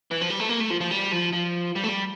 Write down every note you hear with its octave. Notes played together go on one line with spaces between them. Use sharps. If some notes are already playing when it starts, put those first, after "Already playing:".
E3
F3
G3
A3
A#3
A3
F3
F3
G3
F3
F3
G3
A3
G3